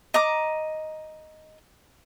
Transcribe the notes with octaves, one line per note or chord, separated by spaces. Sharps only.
D#5 A#5 D6